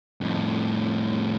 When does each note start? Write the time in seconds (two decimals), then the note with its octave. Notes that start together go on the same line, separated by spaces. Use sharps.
0.21 F2 A2